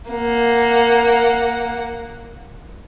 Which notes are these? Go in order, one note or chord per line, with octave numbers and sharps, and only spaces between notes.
A#3 F#5